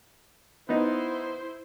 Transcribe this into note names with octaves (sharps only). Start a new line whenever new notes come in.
B3 D#4 E4 C5